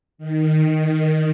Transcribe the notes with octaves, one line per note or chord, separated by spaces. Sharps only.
D#3